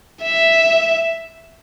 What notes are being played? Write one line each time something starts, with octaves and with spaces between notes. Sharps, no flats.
E5